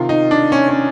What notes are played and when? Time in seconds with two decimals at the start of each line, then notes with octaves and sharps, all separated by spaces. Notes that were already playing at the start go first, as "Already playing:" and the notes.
Already playing: C3 D#3 F4
0.09 D#4
0.31 D4
0.52 C#4
0.69 C#4